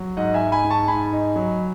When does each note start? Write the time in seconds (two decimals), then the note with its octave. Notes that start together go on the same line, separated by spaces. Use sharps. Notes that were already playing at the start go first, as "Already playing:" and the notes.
Already playing: F#3
0.17 G#2 D#5 F#5
0.34 E5 G#5
0.40 D#4
0.52 G#5 B5
0.64 G#2
0.70 A5 C#6
0.88 G#2 G#5 B5
1.12 D#4
1.36 F#3